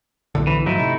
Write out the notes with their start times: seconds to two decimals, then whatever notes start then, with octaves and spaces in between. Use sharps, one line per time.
0.35 B1 A2 D3
0.47 E3
0.66 G#2 F3 F#3 A3 D#4 E4
0.79 C3